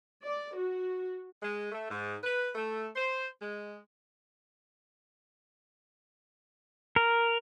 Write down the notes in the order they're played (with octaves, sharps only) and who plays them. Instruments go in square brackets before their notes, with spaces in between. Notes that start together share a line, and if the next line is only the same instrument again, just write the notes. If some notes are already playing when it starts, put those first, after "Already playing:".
[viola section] D5
F#4
[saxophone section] G#3
A3
G#2
B4
A3
C5
G#3
[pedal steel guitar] A#4